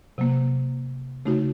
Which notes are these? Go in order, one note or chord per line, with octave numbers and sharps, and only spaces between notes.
C3 F#3 A#3
C#3 A3 D#4 F#4